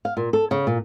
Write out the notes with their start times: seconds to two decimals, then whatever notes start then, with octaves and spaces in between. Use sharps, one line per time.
0.05 F5
0.17 A#2
0.33 A4
0.51 C#3
0.67 A#2